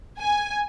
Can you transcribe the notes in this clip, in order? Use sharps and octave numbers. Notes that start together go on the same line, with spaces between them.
G#5